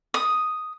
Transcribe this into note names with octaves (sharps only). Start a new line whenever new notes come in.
D#6